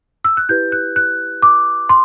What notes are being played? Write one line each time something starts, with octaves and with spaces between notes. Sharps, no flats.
E6
F#6
E4 G4 B4 G6
F#6
F#6
D6
C6